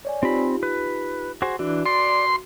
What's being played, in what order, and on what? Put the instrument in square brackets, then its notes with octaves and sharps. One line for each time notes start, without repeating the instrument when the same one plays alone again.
[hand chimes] C#5 D5 G#5
[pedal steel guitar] C4 B5 [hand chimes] D#4 F4 G4
[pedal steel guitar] B4
F#4 G#4 C5
[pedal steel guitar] E3 D4 [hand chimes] F#4
[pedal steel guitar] D5 [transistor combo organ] C6